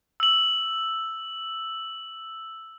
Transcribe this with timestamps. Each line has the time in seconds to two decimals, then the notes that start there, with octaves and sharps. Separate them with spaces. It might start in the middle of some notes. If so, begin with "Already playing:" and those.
0.20 E6 F#7